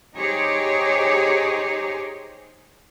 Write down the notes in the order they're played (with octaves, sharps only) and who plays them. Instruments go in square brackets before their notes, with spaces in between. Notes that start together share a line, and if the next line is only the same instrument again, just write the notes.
[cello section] D#4 G4 G#4 C5 C#5